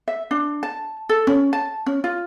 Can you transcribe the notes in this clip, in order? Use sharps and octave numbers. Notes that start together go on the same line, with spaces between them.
E5
D4
A5
A4
C#4
A5
C#4
F4